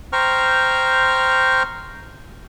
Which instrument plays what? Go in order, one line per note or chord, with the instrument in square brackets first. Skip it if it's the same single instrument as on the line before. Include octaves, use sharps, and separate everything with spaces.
[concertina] C5 G5 A#5 C#6 F6